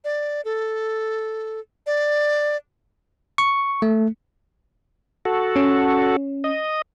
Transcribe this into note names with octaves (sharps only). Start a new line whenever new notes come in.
D5
A4
D5
C#6
A3
F#4 A4
C#4
D#5